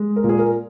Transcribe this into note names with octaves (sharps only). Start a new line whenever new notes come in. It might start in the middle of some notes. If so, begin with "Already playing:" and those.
Already playing: G#3
A#4
A#2
G#4
A#4